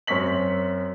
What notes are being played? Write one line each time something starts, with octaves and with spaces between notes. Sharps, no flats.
F#2 C4 C#6 B6 F#7